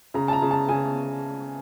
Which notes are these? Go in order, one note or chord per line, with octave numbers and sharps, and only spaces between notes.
C#3 A#5
A5
A#5
C#3
A5
C#3 G#5